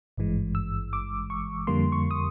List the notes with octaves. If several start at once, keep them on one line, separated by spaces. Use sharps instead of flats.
G#1 G2 E3 G#3
E6
D6
C#6
F2 D3 G3 A#3 C6
C#6
D#6